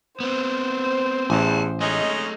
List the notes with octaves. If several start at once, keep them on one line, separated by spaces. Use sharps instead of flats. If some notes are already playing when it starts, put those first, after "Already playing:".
B3 C4 C5
A1 E2 G#5 A5
G#3 A3 C#4 D#4 D#5